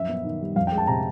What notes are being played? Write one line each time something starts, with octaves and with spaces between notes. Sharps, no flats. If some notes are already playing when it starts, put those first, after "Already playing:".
Already playing: F#2 F3 E5
B3
D#3
G3
F2 F5
G5
G#3
A5
C3 A#5